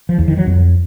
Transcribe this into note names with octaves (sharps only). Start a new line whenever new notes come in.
F3
E2
D#3
F#3
F2